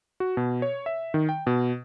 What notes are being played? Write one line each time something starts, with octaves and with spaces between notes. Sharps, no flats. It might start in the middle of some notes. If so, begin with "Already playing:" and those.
F#4
B2
C#5
E5
D#3
G5
B2